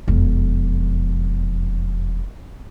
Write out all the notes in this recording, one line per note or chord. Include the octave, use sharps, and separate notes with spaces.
E1 F2